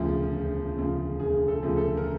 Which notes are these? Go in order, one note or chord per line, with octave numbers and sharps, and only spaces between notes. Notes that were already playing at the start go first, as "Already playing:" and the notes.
Already playing: E1 D2 C#3 F3
E1
D2 C#3 F3
E1 G#4
A4
D2 C#3 F3
A4
A#4